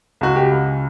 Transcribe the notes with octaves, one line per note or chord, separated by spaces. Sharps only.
C#2 F#4
G4
C#2